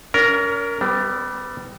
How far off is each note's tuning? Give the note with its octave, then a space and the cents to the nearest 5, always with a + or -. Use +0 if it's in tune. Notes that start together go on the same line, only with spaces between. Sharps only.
C#4 +40 A#4 +0
G3 +0 B3 +35